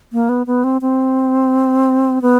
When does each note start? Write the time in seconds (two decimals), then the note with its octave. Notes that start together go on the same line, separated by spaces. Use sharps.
0.13 A#3
0.29 B3
0.47 B3
0.64 C4
0.81 C4
2.22 B3